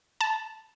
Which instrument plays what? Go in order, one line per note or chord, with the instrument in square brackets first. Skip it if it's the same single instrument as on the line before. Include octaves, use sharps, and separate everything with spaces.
[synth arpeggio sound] A5